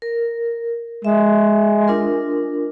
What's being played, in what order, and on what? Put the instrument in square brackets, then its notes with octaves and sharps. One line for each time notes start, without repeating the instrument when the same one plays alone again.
[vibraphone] A#4
[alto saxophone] G#3 [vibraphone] E5
[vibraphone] D4 F4 A#4